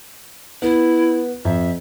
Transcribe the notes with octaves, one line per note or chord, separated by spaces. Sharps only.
B3 E4
F2 E5